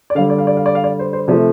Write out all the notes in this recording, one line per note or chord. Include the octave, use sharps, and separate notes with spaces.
D5
D3 G3 F5
D5
F5
D5
F5
D5
F5
D5
C5
C5
C3 F3 A3 D5